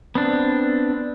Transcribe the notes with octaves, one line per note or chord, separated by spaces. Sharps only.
B3 C4 D4